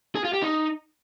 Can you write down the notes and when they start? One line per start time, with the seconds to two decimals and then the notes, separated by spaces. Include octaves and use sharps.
0.15 G#4
0.24 F4
0.33 G4
0.42 D#4